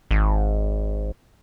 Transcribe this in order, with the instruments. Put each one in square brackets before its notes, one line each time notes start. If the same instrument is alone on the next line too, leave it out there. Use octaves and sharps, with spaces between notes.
[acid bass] G#1